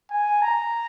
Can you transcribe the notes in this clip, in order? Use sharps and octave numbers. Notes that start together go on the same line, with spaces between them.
G#5
A#5